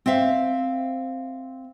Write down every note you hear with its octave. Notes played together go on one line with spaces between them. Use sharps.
C4 C5 E5 F5